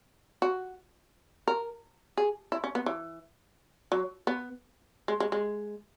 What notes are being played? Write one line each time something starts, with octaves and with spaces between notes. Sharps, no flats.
F#4
A#4
G#4
E4
C#4
B3
E3
F#3
B3
G#3
G#3
G#3